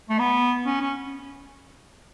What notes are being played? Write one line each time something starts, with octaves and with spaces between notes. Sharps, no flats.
A3
B3
C#4
C#4